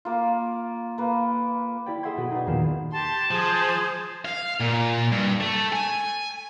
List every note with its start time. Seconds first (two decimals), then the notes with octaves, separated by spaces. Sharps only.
0.05 A#3 F4
0.98 A#3 B4
1.86 E4 G4 D5 G5
2.03 G#4 A4 E5 F#5 C6 G#6
2.17 B2 B3 F#4
2.31 D#4 G#4 B4 D5
2.47 E2 A#2 D#3 A#3 F5 E7
2.92 G4 A5 C6
3.31 F3 G#4 C5
4.25 F5
4.61 A#2
5.12 G2
5.40 A3
5.72 G#5